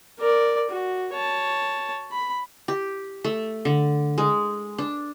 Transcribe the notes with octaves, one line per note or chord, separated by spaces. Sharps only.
A#4 D5
F#4
C#5 A5
B5
G4
A3
D3
G#3
D4